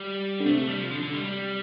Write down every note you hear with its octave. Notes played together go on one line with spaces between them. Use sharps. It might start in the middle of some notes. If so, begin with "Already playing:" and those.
Already playing: G3
D3
C3 A3
A3
G3
F3
D3
D3
G3
G3